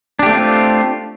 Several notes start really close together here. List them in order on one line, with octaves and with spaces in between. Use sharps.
D4 G4 A3 C4 F4